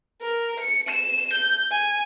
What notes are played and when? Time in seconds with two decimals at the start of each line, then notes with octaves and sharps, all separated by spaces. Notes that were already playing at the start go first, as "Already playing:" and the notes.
0.21 A#4
0.60 C#7
0.89 E7
1.33 G6
1.71 G#5